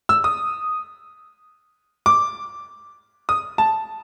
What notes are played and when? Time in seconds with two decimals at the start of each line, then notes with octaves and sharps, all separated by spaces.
0.09 E6
0.24 D#6
2.06 D6
3.29 D#6
3.58 A5